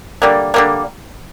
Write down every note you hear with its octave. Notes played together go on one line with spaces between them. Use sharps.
D3 G3 A#3
D3 G3 A#3